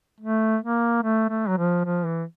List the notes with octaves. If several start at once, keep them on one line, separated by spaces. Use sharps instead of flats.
A3
A#3
A3
A3
F#3
F3
F3
E3